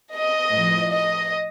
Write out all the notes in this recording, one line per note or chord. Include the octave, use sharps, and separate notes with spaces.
D#5
A2 F3
D#5